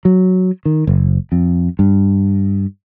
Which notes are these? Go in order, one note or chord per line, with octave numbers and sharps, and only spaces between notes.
F#3
D#3
F#1
F2
G2